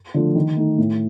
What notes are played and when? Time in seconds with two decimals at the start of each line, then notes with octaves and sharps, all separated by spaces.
0.14 D3 F3 A3
0.35 D#3
0.57 A3 D#4
0.78 A2